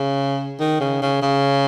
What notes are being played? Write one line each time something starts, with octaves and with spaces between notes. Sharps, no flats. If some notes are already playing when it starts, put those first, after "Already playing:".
Already playing: C#3
D#3
C#3
C#3
C#3